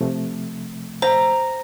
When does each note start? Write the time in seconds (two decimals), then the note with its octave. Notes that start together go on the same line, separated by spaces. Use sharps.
0.01 C3 F3 A3
1.02 C5 A#5